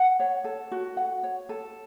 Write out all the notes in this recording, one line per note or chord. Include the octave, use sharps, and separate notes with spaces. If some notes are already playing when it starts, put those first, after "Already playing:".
Already playing: F#5
C#5
A4
F#4
F#5
C#5
A4